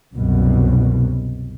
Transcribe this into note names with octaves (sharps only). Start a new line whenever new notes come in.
C2 F#2 B2